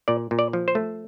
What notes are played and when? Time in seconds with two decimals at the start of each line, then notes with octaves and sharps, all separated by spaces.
0.08 A#2 D5
0.31 A#2
0.39 D5
0.53 F3
0.68 C5
0.75 A3